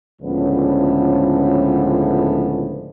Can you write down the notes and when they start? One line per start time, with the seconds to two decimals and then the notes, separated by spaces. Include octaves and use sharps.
0.22 C#2 A2 D3 F3 B3 C#4